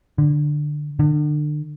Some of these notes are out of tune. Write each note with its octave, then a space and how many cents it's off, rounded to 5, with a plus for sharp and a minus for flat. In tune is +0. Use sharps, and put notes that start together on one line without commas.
D3 +15
D3 +35